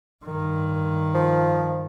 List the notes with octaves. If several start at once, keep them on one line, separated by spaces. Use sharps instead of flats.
G2 D#3
F3